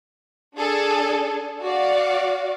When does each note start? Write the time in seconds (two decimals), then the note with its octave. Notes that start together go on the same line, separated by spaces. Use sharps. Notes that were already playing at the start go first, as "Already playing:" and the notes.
0.56 D4 G#4 A4
1.62 F#4 D5 F5